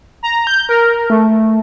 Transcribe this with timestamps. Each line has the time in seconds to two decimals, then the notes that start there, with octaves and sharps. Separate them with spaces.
0.23 A#5
0.47 G6
0.69 A#4
1.10 A3